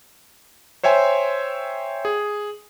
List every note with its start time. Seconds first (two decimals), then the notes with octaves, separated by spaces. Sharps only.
0.83 C5 C#5 E5 G5 G#5 C6
2.05 G#4